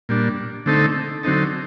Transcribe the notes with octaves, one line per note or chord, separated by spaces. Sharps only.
A#2 G3 D4
D3 A3 C4 D#4 A4
D3 F#3 C4 D#4 A4